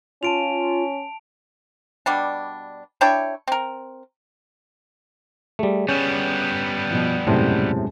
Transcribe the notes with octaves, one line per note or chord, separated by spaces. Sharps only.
C#4 F4 A5 D7 F7
B2 G3 D4
D4 E4 C#5 G5
C4 A#4
G3 A3 G#4
G3 B3 C#4
B2 F3
E1 F#2 A2 C3 C5 A5